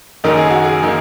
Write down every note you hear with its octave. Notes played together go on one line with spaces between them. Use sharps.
F#1 F#2 D#3 A#3 D#4 A#4
G#4
F#4
G#4
D#3 A#3 D#4